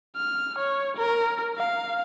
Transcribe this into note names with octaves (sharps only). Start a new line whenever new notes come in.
F6
C#5
A#4
F5